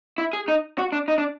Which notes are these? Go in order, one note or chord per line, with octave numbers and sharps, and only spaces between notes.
E4
G#4
D#4
F#4
D4
D#4
D4